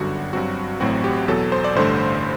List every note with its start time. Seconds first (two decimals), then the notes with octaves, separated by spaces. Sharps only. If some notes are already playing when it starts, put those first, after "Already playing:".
Already playing: G1 F#2 D3 G3 F#4
0.33 G2 F#3 C4 F#4
0.80 A1 A2 F#3 C4 F#4
1.04 G4
1.28 E2 B2 F#3 A4
1.52 C5
1.64 D5
1.75 A1 G2 D3 A3 C5